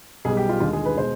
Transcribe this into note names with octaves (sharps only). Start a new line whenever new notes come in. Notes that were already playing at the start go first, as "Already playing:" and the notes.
B1 B2 G3 G#4
G4
F4
D#2 D3 G#3 F4
G#4
B4
B2 G#3 C5